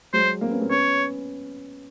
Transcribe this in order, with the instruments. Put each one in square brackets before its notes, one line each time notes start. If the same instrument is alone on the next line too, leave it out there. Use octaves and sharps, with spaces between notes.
[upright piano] F#3 G#3 [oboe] C5
[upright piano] A#3 C4
B3 C#4
A#3 C4
[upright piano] B3 C#4 [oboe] C#5